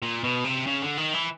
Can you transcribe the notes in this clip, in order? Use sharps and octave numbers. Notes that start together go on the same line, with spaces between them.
A#2
B2
C3
C#3
D3
D#3
E3